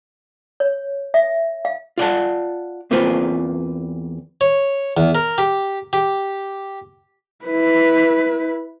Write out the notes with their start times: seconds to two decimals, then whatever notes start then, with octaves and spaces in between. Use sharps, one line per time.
0.60 C#5
1.14 E5
1.65 F5
1.98 F4 D5 F#5 A5
2.91 E2 A#3 C4 F4 B4
4.41 C#5
4.97 E2
5.15 A#4
5.38 G4
5.93 G4
7.45 E4 B4